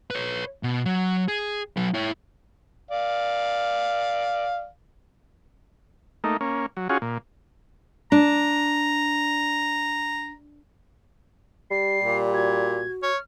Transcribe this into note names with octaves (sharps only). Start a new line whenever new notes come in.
B4 C#5
B2
F#3
G#4
F#3 B4
E4 C#5
D5 F5
A3 A#3 D#4
A#3 C#4
F#3
C#4 F4 F#4 G#4
A#2
D4 A#5
G3 C7
A#2 G4
F#4 G#6
C#5 F6